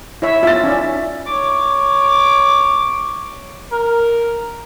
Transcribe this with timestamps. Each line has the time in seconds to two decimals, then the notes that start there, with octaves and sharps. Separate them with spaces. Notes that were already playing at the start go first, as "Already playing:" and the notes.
0.22 E4 C#5 E5
0.43 F4 E5 A6
0.64 C#4 D#4 D5
1.26 C#5 D6
3.72 A#4